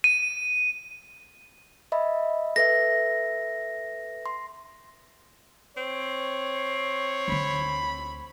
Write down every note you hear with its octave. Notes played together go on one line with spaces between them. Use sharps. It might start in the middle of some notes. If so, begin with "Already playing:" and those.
D#7
D#5 E5 B5
A4 B4 E5 A#6
C6
C4 C#5
D2 D3 B5